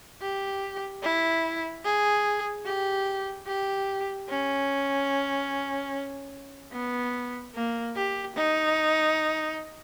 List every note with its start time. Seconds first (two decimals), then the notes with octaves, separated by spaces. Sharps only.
0.21 G4
1.03 E4
1.84 G#4
2.65 G4
3.47 G4
4.28 C#4
6.73 B3
7.55 A#3
7.96 G4
8.36 D#4